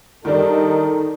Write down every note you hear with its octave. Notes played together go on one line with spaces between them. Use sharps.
D#3 G3 D4 D#4 A4